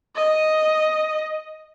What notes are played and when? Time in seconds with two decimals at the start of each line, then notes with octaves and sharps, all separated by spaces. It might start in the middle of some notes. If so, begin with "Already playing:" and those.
0.15 D#5